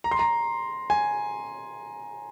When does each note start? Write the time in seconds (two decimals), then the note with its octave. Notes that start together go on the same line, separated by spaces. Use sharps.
0.04 A#5
0.11 C6
0.19 A#5
0.90 G#5